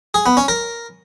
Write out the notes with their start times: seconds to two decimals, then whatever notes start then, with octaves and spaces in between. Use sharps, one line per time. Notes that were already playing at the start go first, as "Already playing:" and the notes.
0.14 G#4
0.26 B3
0.37 C#4
0.48 A#4